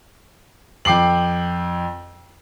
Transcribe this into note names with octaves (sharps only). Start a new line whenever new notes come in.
F2 G5 D6 C7 F#7